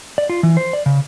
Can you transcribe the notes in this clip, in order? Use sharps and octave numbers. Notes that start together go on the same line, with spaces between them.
D5
F4
E3
C5
D5
C#3